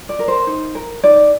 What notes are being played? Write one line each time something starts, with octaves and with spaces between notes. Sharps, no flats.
D5
A#4
C5
D#4
A#4
D#4 D5